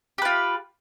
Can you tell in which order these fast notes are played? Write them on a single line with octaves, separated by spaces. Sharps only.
G4 B4 F4